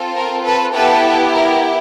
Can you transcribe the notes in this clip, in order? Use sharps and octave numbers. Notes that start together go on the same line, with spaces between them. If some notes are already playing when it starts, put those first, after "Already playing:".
Already playing: C4 F4 A4
A#4
A4 B4
B3 E4 G4 A4 B4
A#4